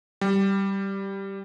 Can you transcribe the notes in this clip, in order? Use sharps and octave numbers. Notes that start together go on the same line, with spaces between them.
G3